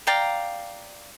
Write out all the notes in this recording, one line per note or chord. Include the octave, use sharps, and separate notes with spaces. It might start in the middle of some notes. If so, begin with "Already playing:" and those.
D5 F5 G5 A#5